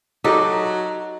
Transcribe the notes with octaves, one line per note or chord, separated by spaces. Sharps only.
F#3 D#4 G4 A4